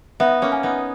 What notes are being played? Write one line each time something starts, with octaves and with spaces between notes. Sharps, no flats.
B3 D#4 E5
A#3 C#4
G#5
B3 D#4